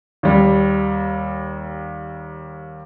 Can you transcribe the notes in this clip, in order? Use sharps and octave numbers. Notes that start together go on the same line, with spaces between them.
D#2 G3